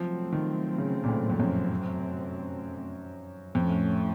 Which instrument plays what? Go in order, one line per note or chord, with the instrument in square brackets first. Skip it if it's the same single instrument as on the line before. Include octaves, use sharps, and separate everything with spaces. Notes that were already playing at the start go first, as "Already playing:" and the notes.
Already playing: [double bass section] C3 F#3 A3 C4 [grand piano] F3
[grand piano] D#3
C#3
A#2
A2
F2
F#2
[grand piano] F2 [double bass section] A2 A3 C#4